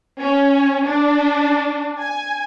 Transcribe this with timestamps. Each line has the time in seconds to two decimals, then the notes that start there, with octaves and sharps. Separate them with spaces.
0.20 C#4
0.85 D4
1.99 G#5